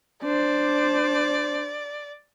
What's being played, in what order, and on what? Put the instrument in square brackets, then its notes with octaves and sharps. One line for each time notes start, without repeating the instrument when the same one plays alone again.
[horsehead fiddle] D4 C5 [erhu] D5